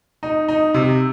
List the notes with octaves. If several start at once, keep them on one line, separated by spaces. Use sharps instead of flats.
D#4
D#4
C3